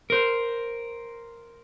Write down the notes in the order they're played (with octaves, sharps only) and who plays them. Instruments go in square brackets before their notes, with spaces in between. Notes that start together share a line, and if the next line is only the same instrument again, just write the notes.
[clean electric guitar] A#4 C5